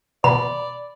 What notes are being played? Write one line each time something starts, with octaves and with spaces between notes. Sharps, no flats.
B2 B4 D5 B5 E7